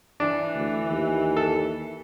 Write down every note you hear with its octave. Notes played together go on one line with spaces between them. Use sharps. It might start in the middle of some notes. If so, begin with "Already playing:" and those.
E3 D4
D2
D#2
A4